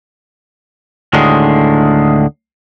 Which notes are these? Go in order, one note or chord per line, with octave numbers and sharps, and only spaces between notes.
D2 A2 D3 D#3 G#3